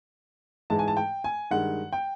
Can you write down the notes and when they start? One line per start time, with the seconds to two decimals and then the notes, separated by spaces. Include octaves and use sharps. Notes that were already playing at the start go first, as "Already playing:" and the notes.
0.70 G#2 E3 G#3 A5
0.79 G#5
0.88 A5
0.97 G5
1.24 G#5
1.51 G2 D#3 G#3 F#5
1.93 G5